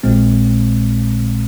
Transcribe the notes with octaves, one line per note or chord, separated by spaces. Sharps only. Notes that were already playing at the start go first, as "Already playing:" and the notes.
A#1 A#2 G#3 C4